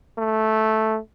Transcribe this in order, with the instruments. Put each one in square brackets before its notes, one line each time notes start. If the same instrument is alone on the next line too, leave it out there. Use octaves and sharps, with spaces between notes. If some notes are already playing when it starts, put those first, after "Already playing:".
[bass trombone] A3